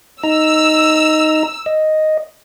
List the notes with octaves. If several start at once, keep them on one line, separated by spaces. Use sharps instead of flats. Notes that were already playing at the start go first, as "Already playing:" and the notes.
D#4 A#5 E6
D#5